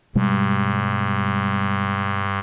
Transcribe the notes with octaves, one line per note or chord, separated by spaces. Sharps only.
G2 B2 G3 G#3